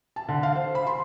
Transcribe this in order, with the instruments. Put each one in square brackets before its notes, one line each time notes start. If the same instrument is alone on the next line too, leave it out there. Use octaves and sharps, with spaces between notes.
[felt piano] A5
D3
F5
C5
B5
C6